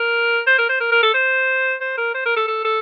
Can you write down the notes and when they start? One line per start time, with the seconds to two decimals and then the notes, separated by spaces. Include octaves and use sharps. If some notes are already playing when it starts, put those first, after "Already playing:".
Already playing: A#4
0.47 C5
0.58 A#4
0.69 C5
0.80 A#4
0.92 A#4
1.03 A4
1.14 C5
1.80 C5
1.97 A#4
2.14 C5
2.25 A#4
2.36 A4
2.48 A4
2.65 A4